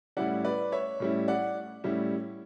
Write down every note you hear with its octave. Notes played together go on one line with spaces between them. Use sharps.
A2 G3 C#4 E4 D5 F#5
B4 D5
C#5 E5
A2 G3 C#4 E4
D5 F#5
A2 G3 C#4 E4